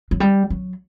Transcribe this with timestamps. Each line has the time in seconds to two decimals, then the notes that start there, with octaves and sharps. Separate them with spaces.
0.11 F#3
0.20 G3
0.50 F#3